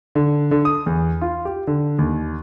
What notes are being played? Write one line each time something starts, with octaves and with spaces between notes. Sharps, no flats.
D3
D3
D#6
E2
F4
G4
D3
D#2